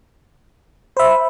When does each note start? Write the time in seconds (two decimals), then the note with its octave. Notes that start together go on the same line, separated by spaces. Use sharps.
0.97 C5 E5 B5